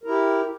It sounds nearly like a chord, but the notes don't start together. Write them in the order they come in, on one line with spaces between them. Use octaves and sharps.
A#4 E4 G4